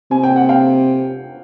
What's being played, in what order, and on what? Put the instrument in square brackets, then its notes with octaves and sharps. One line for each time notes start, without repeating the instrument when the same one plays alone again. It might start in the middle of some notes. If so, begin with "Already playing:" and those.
[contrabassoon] C3 [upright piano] G#5
[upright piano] G5
F#5
F5 G5